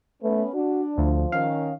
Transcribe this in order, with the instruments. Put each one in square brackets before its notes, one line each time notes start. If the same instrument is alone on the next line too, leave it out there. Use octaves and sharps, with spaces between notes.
[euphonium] A3 [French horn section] B3 C#4 B4
[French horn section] D4 [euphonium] F#4
[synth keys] D2 [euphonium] F3
[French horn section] D#3 C#4 [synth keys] F5